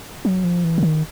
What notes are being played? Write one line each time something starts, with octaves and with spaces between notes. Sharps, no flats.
F#3
F3
E3
D3
D#3